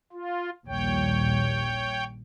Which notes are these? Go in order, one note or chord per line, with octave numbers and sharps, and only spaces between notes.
F4
A#1 D#2 G3 C#5 G5